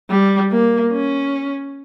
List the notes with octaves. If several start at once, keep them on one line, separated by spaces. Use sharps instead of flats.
G3
A#3
C#4